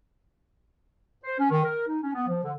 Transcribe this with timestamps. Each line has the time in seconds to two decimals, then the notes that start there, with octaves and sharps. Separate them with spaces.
1.24 C5
1.38 C#4
1.51 D#3
1.64 A#4
1.87 D#4
2.02 C#4
2.14 B3
2.28 F3
2.44 D3